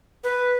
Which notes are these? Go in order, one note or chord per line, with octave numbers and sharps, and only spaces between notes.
B4